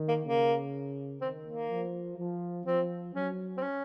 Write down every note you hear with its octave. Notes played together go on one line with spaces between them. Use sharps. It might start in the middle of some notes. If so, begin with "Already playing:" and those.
Already playing: D#3
A#3
C#3 A#3
D#3 C4
A#3
F3
F3
F3 C4
F#3 C#4
C4
C#4